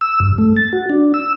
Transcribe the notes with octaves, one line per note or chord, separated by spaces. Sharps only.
E6
G2
A3
A6
F#4
D4
E6